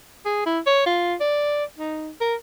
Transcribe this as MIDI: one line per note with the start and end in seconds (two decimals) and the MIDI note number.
0.25 0.43 68
0.46 0.60 64
0.67 0.84 73
0.86 1.15 65
1.20 1.64 74
1.78 2.11 63
2.21 2.35 70